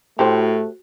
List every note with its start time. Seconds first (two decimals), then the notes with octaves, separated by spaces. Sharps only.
0.19 A2 A3 F#4 G4 C5